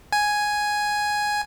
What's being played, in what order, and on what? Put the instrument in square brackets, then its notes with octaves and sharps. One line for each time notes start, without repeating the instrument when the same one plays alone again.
[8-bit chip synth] G#5